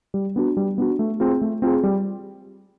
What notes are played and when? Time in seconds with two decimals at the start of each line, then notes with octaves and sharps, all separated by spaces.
0.14 G3
0.36 B3 D4 F#4
0.57 G3
0.78 B3 D4 F#4
0.99 A3
1.20 C4 F4 G#4
1.41 A3
1.62 C4 F4 G#4
1.83 G3